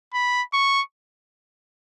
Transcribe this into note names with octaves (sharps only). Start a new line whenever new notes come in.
B5
C#6